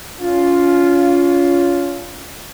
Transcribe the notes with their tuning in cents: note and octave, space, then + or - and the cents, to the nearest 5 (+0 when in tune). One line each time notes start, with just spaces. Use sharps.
C#4 +35 F4 +0